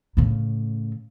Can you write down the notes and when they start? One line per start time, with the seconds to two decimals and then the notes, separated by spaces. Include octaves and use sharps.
0.17 A2 C#3